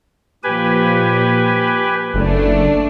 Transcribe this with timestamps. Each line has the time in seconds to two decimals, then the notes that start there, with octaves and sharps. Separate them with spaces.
0.44 A#2 F3 G4 B4 G#5
2.14 F#1 A3 D4